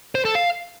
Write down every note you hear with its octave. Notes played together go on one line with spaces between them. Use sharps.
C5
A4
F5